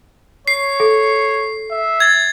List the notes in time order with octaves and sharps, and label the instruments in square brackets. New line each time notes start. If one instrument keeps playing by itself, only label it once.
[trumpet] C#5 [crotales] C7
[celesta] A4
[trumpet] E5
[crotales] G#6 A6